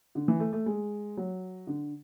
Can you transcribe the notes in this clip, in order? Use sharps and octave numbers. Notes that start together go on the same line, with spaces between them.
D3
E3
A3
A3
G#3
F#3
D3